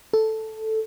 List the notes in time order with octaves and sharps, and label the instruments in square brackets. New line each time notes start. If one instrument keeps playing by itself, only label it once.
[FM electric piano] A4